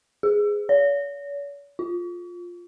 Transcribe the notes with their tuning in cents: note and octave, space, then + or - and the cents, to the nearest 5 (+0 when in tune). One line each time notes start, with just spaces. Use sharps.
G#4 -5
C#5 +45
F4 +10